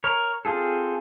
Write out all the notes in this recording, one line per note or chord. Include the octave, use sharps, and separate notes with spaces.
A#4 C#5
C4 F4 G#4 A4